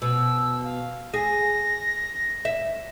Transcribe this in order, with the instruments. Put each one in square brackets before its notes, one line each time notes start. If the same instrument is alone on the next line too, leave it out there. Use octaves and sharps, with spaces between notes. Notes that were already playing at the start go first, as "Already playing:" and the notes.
[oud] B2 [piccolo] E6
[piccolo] F5
[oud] G#4 [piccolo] A#6
[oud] E5